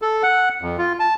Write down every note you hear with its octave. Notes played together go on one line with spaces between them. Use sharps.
A4
F#5
F2
F4
A5